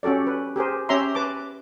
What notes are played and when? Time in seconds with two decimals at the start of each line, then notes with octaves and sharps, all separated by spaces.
0.03 C#4 F#4 G4 A4 D5
0.27 B4
0.56 G4 G#4 A#4 C5
0.89 C#4 G4 C#5 E5 A#5 C6
1.15 B4 A5 D6